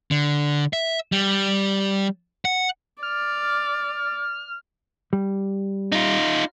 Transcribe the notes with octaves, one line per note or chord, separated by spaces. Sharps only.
D3
E5
G3
F#5
D5 F6
G3
D#4 F4